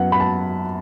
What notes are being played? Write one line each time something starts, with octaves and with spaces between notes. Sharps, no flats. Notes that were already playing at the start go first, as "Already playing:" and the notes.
Already playing: F#2 B3 F#5
B5
A5